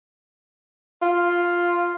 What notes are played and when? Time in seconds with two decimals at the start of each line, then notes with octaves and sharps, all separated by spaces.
1.02 F4